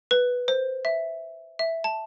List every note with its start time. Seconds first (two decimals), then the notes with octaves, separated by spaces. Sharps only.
0.11 B4
0.48 C5
0.85 E5
1.59 E5
1.84 A5